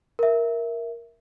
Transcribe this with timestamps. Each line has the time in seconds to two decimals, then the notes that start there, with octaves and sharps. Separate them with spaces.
0.19 A#4 E5